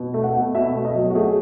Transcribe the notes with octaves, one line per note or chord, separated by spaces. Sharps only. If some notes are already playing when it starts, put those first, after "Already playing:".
Already playing: B2
A3
F#5
B2
B2 E5
A3
D#5
F#3
F#4
A3 G#4